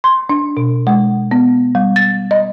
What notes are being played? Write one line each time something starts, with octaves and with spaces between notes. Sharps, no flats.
C6
D4
B2
G#3
B3
G3
A6
D#5